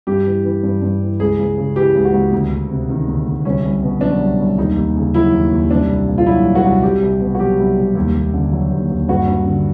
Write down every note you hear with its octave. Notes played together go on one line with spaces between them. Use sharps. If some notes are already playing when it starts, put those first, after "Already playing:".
G2 G4
E3
E3
G2
G2
E3
C#2 G#4
C#2
C#3
E3 G4
C#2
F#4
C#2
D2
D2
C3
D#3
D2
D2
C2 C#4
C2
B2
F#3 D4
C2
C2
D#2 D#4
D#2
C#3
F#3 E4
D#2
D#2
C2 D4
C2
A#2
F4
F#3 E4
C2
F#4
C2
C2 G4
C2
B2
F#4
F#3 G4
C2
C2
D#2
D#2
D3
F#3
D#2
D#2
G2 F#4
G2
D3